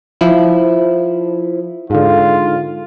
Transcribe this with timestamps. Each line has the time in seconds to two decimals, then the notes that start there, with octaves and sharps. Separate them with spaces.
0.21 F3 E4
1.90 G#2 D3 F4